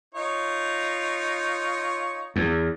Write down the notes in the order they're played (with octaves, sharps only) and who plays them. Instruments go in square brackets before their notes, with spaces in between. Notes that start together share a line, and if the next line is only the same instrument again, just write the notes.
[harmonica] D#4 F4 C#5
[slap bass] E2